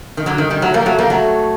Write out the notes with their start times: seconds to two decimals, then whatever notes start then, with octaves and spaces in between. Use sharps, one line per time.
0.17 D#3
0.26 D3 F#3
0.38 D#3
0.50 D#3 G3
0.62 F#3 A3
0.74 G3 A#3
0.86 F#3 A3
0.98 G3 A#3
1.10 F#3 A3